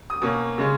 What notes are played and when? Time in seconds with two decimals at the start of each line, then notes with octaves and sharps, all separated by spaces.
0.10 D#6
0.22 B2 A#3 C#4 D#6
0.58 C#3 G#3 C#4